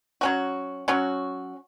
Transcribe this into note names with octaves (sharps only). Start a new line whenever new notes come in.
F#3 C#4 F#4
F#3 C#4 F#4